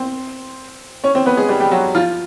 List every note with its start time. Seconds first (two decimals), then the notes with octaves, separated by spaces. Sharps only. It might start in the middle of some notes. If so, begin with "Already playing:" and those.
Already playing: C4 C5
1.04 C#4 C#5
1.15 C4 C5
1.26 B3 B4
1.37 G#3 G#4
1.49 G3 G4
1.60 G3 G4
1.71 F#3 F#4
1.95 F3 F4